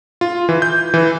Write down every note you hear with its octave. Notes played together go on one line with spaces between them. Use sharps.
F4
E3
G6
E3